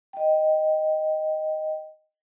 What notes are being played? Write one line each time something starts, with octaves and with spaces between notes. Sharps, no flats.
D#5 G5